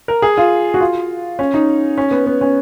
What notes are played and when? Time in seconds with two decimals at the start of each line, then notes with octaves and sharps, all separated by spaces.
0.08 A#4
0.22 G#4
0.38 F4
0.74 F#4
0.80 F4
1.39 C#4
1.54 D#4
1.98 C#4
2.11 B3
2.26 B3
2.41 C#4